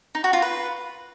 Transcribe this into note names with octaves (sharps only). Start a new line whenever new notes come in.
D#4
F#4
F4
B4